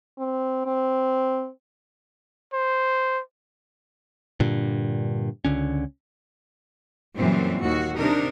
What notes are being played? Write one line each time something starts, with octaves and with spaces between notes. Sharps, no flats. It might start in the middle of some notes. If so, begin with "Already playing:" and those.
C4
C4
C5
G2 A#2 D3
C#2 D3 C#4
F#2 A#2 E3 G3 C4
D#2 F#4
C3 D4 D#4 A#4